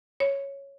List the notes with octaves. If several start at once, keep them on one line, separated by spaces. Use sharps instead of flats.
C#5